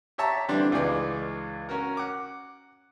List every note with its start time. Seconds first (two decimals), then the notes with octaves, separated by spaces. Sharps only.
0.18 G4 C#5 E5 A5 A#5 C#6
0.48 D3 E3 G3 C4 D4
0.72 C#2 E3 G#3 D5
1.69 C#4 F#4 A#4
1.97 F#5 D6